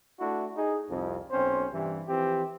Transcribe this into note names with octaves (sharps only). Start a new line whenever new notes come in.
A3 D4 E4 F#4
D#4 G#4
C2 F2
B1 C4 C#4 C5
G2 C3 E3
E3 F3 C4 G4